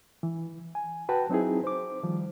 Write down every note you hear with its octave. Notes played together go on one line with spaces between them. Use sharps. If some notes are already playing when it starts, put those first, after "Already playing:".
E3
G#5
F#4 B4 G5 A5
F#3 C4 D#4 E4 G#4
C5 D6
D#3 F3 G3